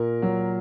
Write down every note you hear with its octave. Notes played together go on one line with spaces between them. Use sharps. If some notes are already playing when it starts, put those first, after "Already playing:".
Already playing: A#2 A#4
F#3